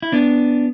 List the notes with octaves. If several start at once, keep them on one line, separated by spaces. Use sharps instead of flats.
E4
B3 D4